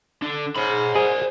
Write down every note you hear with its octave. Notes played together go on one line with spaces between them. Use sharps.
D3 D4
G#2 C#5 B5
G#4 C5 D5